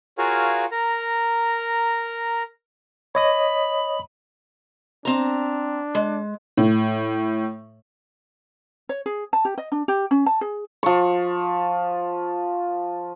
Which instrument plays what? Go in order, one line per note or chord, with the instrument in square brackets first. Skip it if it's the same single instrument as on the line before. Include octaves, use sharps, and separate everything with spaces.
[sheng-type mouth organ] F4 F#4 G#4 A#4 C#5 F5
A#4 A#5
[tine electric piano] C#5 D#5 D#6 [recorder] B5
[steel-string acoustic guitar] C4 A#5 [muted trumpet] D4
[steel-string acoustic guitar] G#3
[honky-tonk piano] A2
[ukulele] C#5
G#4
A5
G4
D#5
D4
G4
C#4
A5
G#4
[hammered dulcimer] F3 C#6